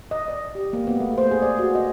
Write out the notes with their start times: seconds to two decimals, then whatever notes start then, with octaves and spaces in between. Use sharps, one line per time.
0.11 D#5
0.28 D5
0.55 G4
0.73 A#3
0.87 B3
1.00 A3
1.18 C5
1.31 G#4
1.42 D5
1.59 F#4
1.75 D#5